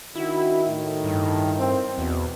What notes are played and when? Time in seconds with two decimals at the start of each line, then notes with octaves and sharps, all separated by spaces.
0.15 D#3 D4 E4 F#4
0.66 A2
1.04 G2
1.59 C4
1.98 E2 B2